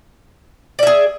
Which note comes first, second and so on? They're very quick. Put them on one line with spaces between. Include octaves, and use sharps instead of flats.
D5 E5 G#4